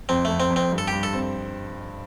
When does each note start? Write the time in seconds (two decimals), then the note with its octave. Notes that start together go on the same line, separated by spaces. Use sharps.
0.09 F2 C4
0.25 A3
0.30 F2
0.40 C4
0.50 F2
0.56 C4
0.71 G2
0.78 A4
0.88 G2 G4
1.03 A4
1.13 C4